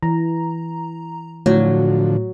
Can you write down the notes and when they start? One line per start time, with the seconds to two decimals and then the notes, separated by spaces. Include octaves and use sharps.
0.03 E3 A#5
1.46 A2 D3 F3 F#3